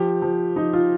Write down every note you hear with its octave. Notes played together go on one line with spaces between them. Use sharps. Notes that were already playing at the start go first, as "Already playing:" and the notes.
Already playing: F3 G4
F3
F3 D#4
F4